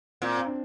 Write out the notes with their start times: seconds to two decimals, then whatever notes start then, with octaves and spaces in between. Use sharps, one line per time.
0.22 A#2 C4
0.37 C4
0.46 D4